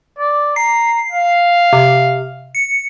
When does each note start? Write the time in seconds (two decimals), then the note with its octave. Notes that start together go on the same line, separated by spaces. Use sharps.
0.18 D5
0.56 A#5 C7
1.12 F5
1.73 C3
2.55 C#7